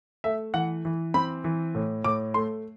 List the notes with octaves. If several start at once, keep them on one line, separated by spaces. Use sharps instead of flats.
A3 E5
E3 F#5
E3
C4 B5
E3
A2
A2 D6
A3 C6